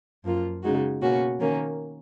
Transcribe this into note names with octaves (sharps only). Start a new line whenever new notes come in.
F#2 F3 A#3 F4
C#3 G#3 D#4 F#4
B2 A#3 C#4 F#4
D#3 A#3 C#4